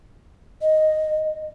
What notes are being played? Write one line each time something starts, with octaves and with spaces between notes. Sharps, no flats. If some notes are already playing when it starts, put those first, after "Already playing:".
D#5